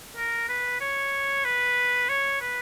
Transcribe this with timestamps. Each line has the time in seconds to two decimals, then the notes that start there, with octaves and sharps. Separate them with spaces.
0.16 A#4
0.49 B4
0.81 C#5
1.45 B4
2.09 C#5
2.41 B4